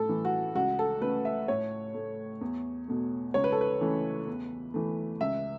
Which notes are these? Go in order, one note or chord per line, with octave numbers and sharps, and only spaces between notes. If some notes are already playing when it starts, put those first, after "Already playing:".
Already playing: A2 A4
E3 A3
F#4
C#2 F#4
A4
C#3 A3 B4
E5
A2 C#5
A3
E2
B2 A3
C#2 C#5
B4
A4
B4
C#3 E3 A3
E2
E3 A3
C#2 E5